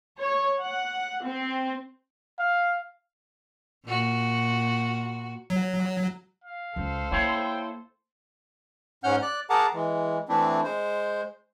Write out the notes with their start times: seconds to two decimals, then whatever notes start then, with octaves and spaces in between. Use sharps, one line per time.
0.19 C#5
0.61 F#5
1.22 C4
2.39 F5
3.86 A#2 F#4
5.50 F#3
6.44 F5
6.76 C#2 A4 C5
7.11 A#3 E4 C#5 F5 G5
9.04 G#2 C#4 F#5 F6 G6
9.22 D5 F#6
9.50 G#4 A#4 F#5 A5 A#5 D6
9.74 E3 G#3
10.29 E3 A3 C4 D4 E4
10.64 G#3 C5